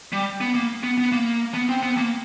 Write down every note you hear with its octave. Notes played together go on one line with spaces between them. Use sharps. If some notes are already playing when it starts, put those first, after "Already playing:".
G3
B3
A#3
B3
B3
A#3
B3
C4
B3
A#3